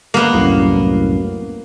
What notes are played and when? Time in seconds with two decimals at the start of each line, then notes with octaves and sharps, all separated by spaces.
0.14 A#3 B3
0.34 C2 F#2 A2